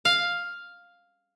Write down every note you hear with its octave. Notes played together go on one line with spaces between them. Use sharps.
F5